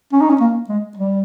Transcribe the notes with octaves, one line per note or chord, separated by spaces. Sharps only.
C#4
D#4
C#4
A#3
G#3
G3